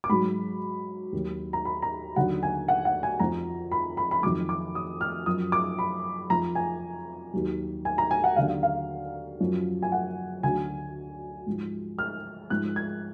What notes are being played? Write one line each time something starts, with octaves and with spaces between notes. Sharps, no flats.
D6
G#2 F#3 B5
D#2 D#3 F#3
A#5
B5
A#5
D#2 D3 F#3 F#5
G#5
F#5
F#5
G#5
F2 F3 A#5
B5
B5
B5
F2 D#3 F#3 D6
D6
D#6
F6
F#2 F3 D#6
D6
B5
F2 F3 A#5
G#5
D#2 D#3 F#3
G#5
A#5
G#5
F#5
D#2 D3 F#3 F5
F5
F#2 F3
G#5
F#5
D2 D3 F#3 G#5
G#2 F3
F6
G#2 F3 F#6
G#6